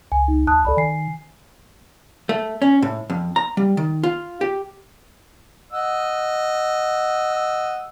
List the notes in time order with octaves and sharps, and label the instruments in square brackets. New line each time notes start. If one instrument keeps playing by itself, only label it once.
[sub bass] C#2 [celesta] G#5
[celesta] D#4
[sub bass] D#2 [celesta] A5 D#6 F#6
[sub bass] C#2 [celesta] A4 D5 B5
[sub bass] D#3 [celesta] G#5 C7
[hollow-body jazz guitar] A3
C#4
A2
F2
A#5
G3
D#3
F4
G4
[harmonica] D#5 F#5 E6